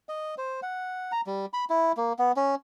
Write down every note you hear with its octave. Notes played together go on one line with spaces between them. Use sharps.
D#5
C5
F#5
A#5
G3
B5
E4
A#3
B3
C#4